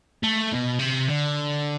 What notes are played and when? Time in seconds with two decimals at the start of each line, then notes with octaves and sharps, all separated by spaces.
0.23 A3
0.52 B2
0.79 C3
1.08 D3